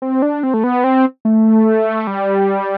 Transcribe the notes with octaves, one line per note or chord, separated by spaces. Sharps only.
C4
D4
C4
A3
B3
C4
A3
G3